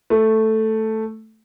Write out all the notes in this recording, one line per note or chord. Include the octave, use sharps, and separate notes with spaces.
A3